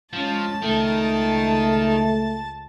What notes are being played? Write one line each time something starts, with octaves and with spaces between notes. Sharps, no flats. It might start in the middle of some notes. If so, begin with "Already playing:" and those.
F3 G#3 C#4 A5
C#2 D#3 A3